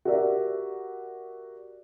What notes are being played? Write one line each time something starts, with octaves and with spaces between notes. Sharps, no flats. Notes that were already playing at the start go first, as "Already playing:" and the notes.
F#4 G4 A#4 D5 E5